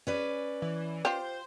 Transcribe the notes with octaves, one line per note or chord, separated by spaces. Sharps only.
C#4 B4 D5
E3
F4 G4 C5